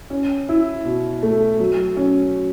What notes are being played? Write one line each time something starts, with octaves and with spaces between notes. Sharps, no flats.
C#4
E4
B2
A3
F#3
C#4